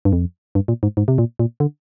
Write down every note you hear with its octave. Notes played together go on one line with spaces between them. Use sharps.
G2
F2
G2
A#2
G#2
G#2
C3
A#2
A#2
D3